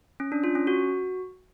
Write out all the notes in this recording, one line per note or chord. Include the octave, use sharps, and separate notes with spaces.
C#4
D4
F4
C#4
F#4